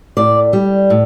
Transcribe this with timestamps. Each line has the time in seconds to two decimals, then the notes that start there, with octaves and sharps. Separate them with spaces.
0.17 A2 D5
0.53 G3
0.90 A2